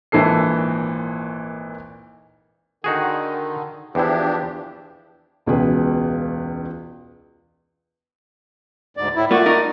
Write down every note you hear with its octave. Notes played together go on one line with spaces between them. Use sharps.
G#1 A#2 E3 D4 A4 C7
D3 D#3 D#4 F#4 G#4
E2 F3 D4 E4 G4
E1 C#2 B2 G#4 B4
D2 G#2 D5
A2 E4
A3 A#3 F4 F#4 D5
D#4 A#4